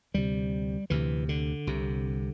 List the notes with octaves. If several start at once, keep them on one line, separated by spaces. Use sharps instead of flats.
D2 C3 G3
D2 C3 E3
D3
C2 C3